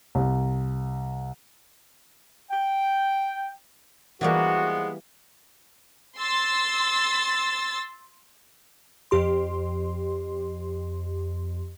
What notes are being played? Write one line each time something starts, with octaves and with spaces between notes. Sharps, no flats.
C2
G5
E3 F3 G3 G#3 A#3 B3 F#4
C6 E6 A6
F2 G4 C6